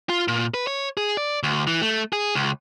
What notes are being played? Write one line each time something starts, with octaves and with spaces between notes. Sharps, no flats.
F4
A#2
B4
C#5
G#4
D5
D2
E3
A3
G#4
C#2